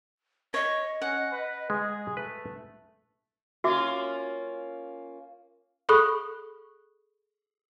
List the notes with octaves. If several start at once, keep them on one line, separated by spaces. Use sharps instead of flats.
C#5 D#5
C#4 F#5
B4
G#3 G#4
A3 B4
A#3 C#4 F4 F#4 E5 D6
G#4 A4 B5 C#6 D#6 F#6